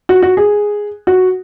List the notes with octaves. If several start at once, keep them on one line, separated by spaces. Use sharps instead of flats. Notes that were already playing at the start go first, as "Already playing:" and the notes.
F#4
F#4
G#4
F#4